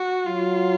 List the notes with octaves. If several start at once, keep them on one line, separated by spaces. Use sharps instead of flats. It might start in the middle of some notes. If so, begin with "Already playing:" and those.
Already playing: F#4
F#3 F4